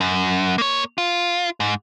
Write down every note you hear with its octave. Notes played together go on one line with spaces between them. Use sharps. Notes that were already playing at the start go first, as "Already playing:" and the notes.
F#2
A#3 C#5
F4
G#2